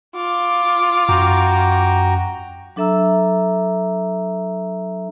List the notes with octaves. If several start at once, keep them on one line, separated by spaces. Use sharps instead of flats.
F4 D6
F#2 F#4 G5 A#5
F#3 D4 A4 E5 A#5 E6